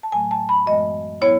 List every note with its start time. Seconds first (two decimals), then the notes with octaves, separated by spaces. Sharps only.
0.03 A5
0.12 A2 F#3 A3 G#5
0.31 A5
0.49 B5
0.66 F#2 E3 G#3 B3 D#5
1.21 F#3 B3 E4 C#5